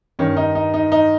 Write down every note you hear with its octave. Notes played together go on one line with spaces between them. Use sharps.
G2 D#3 C#4
D#4
D#4
D#4
D#4